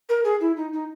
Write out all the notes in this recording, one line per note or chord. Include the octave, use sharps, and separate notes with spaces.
A#4
G#4
E4
D#4
D#4